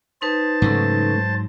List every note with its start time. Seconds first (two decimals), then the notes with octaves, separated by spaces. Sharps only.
0.22 D#4 B4 C5 A5
0.62 G#2 C#3 F#3 A3